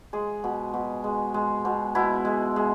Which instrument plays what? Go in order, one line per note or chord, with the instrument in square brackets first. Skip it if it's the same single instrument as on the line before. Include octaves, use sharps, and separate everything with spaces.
[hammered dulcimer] G#3 G#4
B2
B2
G#3
G#3
B2
B2 E4
G#3
G#3